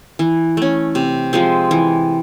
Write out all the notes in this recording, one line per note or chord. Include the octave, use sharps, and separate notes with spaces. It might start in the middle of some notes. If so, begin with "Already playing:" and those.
E3
A3 C#4
C3
F3 G#3 C4
E3